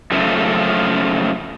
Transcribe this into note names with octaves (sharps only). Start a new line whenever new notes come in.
F#2 C#3 F3 A3